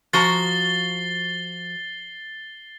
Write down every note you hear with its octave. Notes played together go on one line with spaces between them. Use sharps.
F3 F#4 A#5 A6 C7 G7